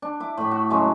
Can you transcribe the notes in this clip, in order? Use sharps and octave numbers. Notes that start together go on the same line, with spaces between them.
D4
E4 D6
A2 B5
F#4
C#3 F#3 G#3 A3